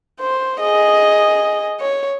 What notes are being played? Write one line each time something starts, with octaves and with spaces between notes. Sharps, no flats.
C5
G#4 D#5
C#5